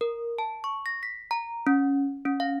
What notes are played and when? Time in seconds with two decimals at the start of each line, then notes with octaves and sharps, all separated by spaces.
0.01 A#4
0.38 A5
0.64 C#6
0.86 A#6
1.03 B6
1.31 A#5
1.67 C#4
2.25 C#4
2.40 F5